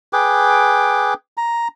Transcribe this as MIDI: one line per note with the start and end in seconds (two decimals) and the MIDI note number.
0.13 1.14 68
0.13 1.14 71
0.13 1.14 79
0.13 1.14 86
1.37 1.68 82